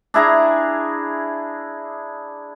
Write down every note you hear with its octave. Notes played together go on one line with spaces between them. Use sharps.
D4 E4 G#4 A#5